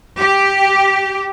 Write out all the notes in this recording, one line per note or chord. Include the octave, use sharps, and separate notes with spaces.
G4